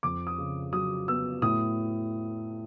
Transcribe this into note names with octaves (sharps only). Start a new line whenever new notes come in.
F2 D6
D#6
C#3
F#3 D#6
B3 E6
A2 D#6